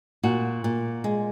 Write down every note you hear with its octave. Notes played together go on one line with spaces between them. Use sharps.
A#2 F#4
A#2
G#3